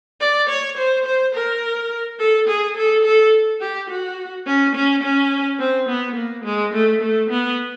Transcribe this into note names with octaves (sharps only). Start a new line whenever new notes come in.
D5
C#5
C5
C5
A#4
A4
G#4
A4
A4
G4
F#4
C#4
C#4
C#4
C4
B3
A#3
G#3
A3
A3
B3